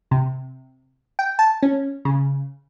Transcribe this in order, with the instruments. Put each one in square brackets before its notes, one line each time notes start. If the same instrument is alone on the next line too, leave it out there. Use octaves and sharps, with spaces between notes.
[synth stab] C3
G5
A5
C#4
C#3